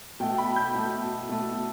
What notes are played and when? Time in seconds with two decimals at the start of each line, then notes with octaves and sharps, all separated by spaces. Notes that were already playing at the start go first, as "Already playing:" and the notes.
0.20 B2 A3 G5
0.38 B5
0.56 G6
0.75 B2 A3
1.29 B2 A3